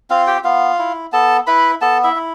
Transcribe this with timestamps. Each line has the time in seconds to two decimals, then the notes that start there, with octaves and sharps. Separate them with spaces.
0.10 C4 F4 F5
0.27 G4 G5
0.44 B3 F4 F5
0.79 E4
1.12 B3 A4 A5
1.47 E4 B4 B5
1.81 B3 A4 A5
2.04 E4 E5
2.15 E4